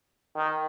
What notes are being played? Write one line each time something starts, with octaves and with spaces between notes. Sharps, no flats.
D#3